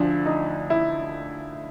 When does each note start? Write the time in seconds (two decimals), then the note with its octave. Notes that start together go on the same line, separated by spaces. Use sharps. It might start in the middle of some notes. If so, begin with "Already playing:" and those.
Already playing: D2 D3 F3 D4
0.26 D#4
0.70 E4